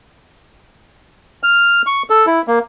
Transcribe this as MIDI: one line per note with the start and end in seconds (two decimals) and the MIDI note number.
1.43 1.82 89
1.86 2.02 85
2.10 2.26 69
2.27 2.42 64
2.47 2.59 58